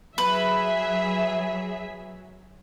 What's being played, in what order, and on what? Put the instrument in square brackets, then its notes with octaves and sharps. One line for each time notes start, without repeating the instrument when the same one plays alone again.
[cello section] F#3 [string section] G#4 E5 [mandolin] B4